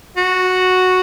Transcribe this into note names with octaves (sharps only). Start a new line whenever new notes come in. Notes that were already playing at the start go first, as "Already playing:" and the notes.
F#4